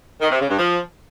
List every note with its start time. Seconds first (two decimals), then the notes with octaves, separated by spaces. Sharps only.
0.21 D#3
0.31 C3
0.40 C#3
0.50 G2
0.59 F3